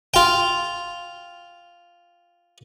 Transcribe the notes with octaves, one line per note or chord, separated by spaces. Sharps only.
F4 G5